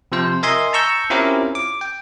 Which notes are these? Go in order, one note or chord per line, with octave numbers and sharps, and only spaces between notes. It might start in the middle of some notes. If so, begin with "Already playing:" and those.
C3 F3 C5
A#4 D#5 E5 G#5 C6
A5 A#5 C#6 E6 G6
C4 C#4 E4 F4 G4 A#4
D6
G5